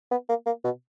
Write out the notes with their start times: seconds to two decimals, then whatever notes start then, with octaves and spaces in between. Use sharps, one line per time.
0.11 B3
0.29 A#3
0.46 A#3
0.64 B2